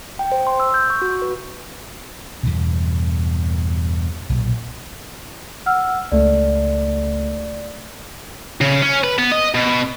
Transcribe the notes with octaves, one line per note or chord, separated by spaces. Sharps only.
G5
C5
C6
E6
G6
C#6
F#4
B4
E2 G2 B2
B1 A#2
F#5 E6 F6
C#2 A3 D5
C#3
C#4
B4
B3
D#5
B2